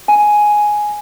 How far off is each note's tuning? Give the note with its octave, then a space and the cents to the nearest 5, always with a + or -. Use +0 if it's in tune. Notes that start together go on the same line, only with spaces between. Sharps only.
G#5 +5